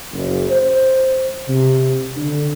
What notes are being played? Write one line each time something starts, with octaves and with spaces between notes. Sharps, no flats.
F#1
C5
C3
D3